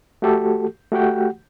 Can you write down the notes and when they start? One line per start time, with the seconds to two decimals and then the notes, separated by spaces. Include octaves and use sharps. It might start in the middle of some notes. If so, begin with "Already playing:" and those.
0.22 A3 F#4 G4 A4
0.92 A3 F#4 G4 F#5 G5